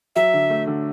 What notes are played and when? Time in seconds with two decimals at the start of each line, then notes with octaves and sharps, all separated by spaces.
0.16 F#3 E5
0.33 D3
0.50 A3
0.67 D3